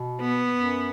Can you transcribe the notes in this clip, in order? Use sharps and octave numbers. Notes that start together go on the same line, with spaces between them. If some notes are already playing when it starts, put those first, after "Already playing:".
Already playing: B2
B3
F#2